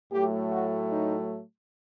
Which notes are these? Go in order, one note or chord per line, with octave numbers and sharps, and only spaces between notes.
A2 F#3 A3 G4
F#4
D#4